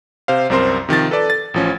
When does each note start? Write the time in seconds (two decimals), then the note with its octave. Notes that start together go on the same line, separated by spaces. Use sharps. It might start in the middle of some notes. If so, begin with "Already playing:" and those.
0.28 C3 C5 F5
0.50 C2 F#2 C4 A#4 C5 C6
0.89 C3 D#3 F3 A6
1.11 A4 B4 D5 A5
1.30 A6
1.54 A1 F3 C#4